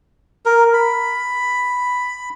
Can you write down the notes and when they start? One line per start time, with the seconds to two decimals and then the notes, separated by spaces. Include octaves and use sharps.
0.46 A#4
0.73 B5